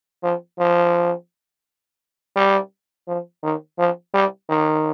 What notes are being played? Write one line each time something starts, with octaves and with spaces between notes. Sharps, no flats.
F3
F3
G3
F3
D#3
F3
G3
D#3